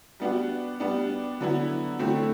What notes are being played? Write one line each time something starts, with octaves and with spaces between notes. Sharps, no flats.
G3 B3 D4 F#4
G3 B3 D4
D3 F#3 B3 E4
D3 F#3 A3 C4 E4